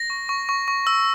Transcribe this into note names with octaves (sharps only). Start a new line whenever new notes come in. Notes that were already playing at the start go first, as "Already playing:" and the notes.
Already playing: A#6
C#6
C#6
C#6
C#6
E6